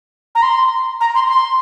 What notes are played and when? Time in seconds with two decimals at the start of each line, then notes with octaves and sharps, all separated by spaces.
0.35 A#5
0.42 C6
1.00 A#5
1.14 C6
1.28 C6